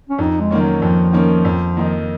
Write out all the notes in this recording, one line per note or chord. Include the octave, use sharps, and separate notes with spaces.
C#4
F2 D#4
G#3
D#3 A#3 C#4
F#3
F2 F3
D#3 A#3 C#4
F2
D#3 A#3 D#4